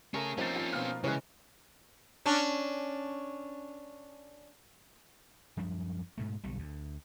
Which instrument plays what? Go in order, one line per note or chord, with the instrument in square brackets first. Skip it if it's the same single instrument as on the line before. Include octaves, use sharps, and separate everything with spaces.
[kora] A3 A#4 [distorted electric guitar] C#4 G#4 [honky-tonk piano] A5
[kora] F3 A#3 D#4 [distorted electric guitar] C4 C#4 [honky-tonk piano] F4 A6
[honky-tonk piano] F4
B2 F5 F6
[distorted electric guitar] C#3 [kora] E3 G#3 [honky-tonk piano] C#5 F#6
[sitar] C#4 D4
[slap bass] F#2 F3 G3 D4
G#2 B2 A3
B1 B2 D3 G3
D2